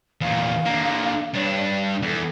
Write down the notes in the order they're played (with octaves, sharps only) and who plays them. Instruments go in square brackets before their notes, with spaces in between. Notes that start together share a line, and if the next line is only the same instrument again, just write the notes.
[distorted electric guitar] E2 A#2 [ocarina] F5
[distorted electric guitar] D3 A#3
[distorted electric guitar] G2 D4 [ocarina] C#5
[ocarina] D5
[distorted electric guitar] E2 [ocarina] A4